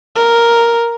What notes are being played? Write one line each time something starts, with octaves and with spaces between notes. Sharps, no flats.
A#4